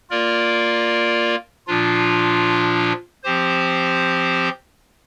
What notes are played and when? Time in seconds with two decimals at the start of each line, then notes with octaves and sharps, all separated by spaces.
0.10 A#3 F4 A#4 D5
1.67 A#2 F3 D4 F4
3.23 F3 C4 G4 C5